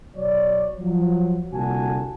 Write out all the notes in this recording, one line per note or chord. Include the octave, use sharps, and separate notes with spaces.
B2 F#3 C#5 D5
F3 F#3
C2 A#2 D3 F#4 G#5 A5